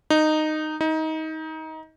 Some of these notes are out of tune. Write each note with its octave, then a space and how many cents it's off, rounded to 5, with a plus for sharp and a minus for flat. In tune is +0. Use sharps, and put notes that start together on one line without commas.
D#4 -10
D#4 +25